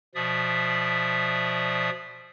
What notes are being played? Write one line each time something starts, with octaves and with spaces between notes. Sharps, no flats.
B2 F3 D5 E5 D#6